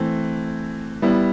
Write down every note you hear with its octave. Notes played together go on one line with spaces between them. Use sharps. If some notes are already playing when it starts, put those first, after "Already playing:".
Already playing: E3 A3 C4
G3 B3 E4